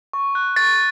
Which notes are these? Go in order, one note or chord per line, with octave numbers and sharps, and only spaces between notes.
C#6
F#6
C#6 A6